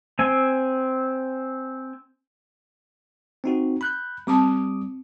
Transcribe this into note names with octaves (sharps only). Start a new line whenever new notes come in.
C4 G#5
C4 D#4 F#4
B5 F#6 G6
G3 C4 A5 D6 D#6